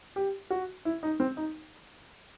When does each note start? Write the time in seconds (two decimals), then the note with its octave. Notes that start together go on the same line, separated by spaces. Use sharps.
0.16 G4
0.50 F#4
0.85 E4
1.03 D#4
1.20 C4
1.37 D#4